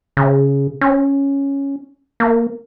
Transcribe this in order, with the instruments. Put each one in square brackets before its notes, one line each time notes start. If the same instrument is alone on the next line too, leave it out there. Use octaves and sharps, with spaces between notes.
[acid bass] C#3
C#4
A#3